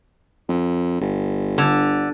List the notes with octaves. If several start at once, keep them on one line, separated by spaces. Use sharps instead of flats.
F2
G1
D3